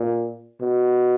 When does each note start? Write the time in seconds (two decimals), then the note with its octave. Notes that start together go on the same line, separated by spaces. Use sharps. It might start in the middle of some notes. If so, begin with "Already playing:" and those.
Already playing: A#2
0.61 B2